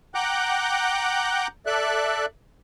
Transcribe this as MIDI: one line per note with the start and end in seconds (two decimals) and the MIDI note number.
0.15 1.47 78
0.15 1.47 79
0.15 1.47 82
0.15 1.47 86
0.15 1.47 90
0.15 1.47 91
1.66 2.26 69
1.66 2.26 74
1.66 2.26 76
1.66 2.26 90